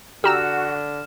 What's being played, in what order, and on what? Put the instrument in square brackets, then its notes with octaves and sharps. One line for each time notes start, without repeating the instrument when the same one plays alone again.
[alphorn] D3 [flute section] F#4 [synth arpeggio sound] G4 A#5 E6 [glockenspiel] F6 E7